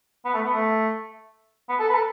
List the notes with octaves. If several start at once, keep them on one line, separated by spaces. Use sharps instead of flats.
B3
A3
B3
A3
B3
A4
B4
A4